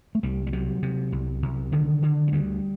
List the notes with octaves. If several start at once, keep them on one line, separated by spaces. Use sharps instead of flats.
A3
C2 G3
G3
C3 F#3
C3
C2
C2
D3 D#3
D3
F#3
D2 G3